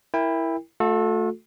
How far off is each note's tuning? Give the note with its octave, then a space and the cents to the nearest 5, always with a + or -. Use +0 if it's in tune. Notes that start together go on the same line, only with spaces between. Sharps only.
E4 +0 A#4 +0 G5 +30
A3 +0 F#4 -45 A4 -5